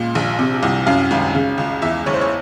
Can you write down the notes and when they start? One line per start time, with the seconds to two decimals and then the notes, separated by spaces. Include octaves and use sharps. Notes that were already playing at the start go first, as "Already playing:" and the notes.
Already playing: C#2 A#2
0.15 A#1
0.39 C3
0.63 C2
0.87 F#2 F5
1.11 G#1
1.35 C#3
1.58 C#2
1.82 E2 E5
2.06 F#1 C#5
2.14 C5
2.21 C#5